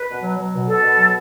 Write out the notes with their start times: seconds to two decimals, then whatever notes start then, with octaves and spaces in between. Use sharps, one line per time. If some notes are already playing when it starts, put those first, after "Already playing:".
Already playing: B4
0.08 B2
0.22 F#3
0.37 F#3
0.53 B2
0.68 B2 A4
0.83 B2
0.97 F#3